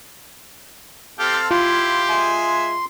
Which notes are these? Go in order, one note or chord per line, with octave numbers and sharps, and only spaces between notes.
C4 G4 A4 F5
E4 F4 G4 C6
G#3 E5 G#5